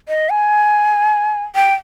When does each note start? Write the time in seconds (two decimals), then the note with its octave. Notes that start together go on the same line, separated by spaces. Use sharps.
0.08 D#5
0.30 G#5
1.55 G5